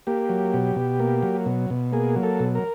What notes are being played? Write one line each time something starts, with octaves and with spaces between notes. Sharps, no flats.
A#3 G4
F#3
B2
B2
A#3
F#3
B2
B2
A#3 G#4
F#3
A4
B2
A#4